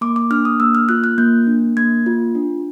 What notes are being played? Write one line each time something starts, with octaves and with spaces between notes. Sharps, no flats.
A#3 D6
D6
D4 F6
D#6
A#3 E6
F6
F4 F#6
F#6
A#3 G6
D4
A#3 G#6
F4
D4